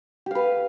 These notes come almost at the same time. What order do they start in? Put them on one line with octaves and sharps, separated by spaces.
G4 F5 B4